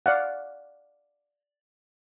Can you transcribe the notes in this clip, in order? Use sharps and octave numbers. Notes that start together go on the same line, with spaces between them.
D5 F5 F#5